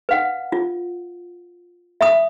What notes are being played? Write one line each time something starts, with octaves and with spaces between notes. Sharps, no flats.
B4 F5 F#5
F4
E5 B5 D#6